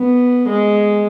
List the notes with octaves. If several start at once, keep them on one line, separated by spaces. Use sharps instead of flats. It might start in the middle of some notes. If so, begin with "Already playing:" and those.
Already playing: B3
G#3